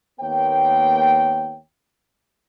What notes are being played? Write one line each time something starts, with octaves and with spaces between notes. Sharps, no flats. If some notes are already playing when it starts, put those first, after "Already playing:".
D#2 A#3 B3 C#5 G5